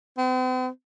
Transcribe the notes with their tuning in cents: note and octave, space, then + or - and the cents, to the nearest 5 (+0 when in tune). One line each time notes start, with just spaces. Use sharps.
C4 -45